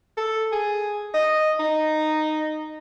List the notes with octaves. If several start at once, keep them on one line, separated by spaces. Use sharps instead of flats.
A4
G#4
D#5
D#4